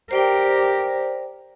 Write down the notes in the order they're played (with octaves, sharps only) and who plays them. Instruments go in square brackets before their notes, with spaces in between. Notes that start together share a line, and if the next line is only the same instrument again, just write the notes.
[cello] G4 A#4 [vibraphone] C5 D5 G5